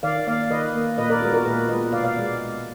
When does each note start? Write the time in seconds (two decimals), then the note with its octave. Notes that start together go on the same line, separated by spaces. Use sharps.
0.03 D#3 D5 F5
0.27 A#3 D5 F5
0.51 D#3 B4 D#5
0.74 A#3
0.98 A#2 B4 D#5
1.10 A#4 D5
1.22 G#3 B3 F#4 A#4
1.33 F#4 A#4
1.45 A#2 G#4 B4
1.68 G#3 B3 B4 D#5
1.92 B2 D5 F5
2.04 D5 F5
2.17 G#3 B3